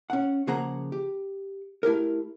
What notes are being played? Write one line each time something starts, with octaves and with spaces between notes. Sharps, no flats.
C#4 F#5
C#3 F3 A#3 G#4 F#5 A#5
G4
A3 E4 G4 A#4